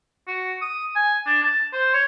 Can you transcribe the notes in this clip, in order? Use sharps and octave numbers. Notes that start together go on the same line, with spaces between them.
F#4
D#6
G#5
D4
A5
C5
C#5